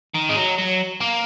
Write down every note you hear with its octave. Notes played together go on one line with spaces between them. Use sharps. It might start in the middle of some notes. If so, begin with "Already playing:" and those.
D#3
G#3
F#3
F#3
A#3